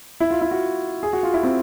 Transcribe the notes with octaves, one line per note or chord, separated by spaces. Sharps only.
E4
F4
E4
F#4
G#4
F#4
F4
E4
C4